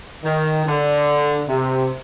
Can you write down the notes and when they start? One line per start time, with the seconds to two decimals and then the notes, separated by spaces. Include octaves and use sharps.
0.24 D#3
0.66 D3
1.48 C3